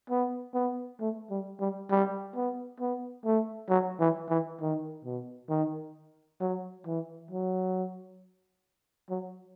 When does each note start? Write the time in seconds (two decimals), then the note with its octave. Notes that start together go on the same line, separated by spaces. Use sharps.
0.10 B3
0.54 B3
1.00 A3
1.30 G3
1.60 G3
1.91 G3
2.36 B3
2.80 B3
3.25 A3
3.70 F#3
4.00 E3
4.30 E3
4.61 D#3
5.05 B2
5.50 D#3
6.41 F#3
6.86 E3
7.31 F#3
9.10 F#3